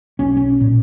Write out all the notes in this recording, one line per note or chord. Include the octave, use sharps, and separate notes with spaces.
B1 C#4
C#4
A#2